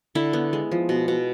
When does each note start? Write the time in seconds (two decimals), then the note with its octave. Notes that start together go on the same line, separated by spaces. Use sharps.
0.15 D3 E4
0.33 B3
0.53 G#3
0.72 F3
0.89 B2
1.08 B2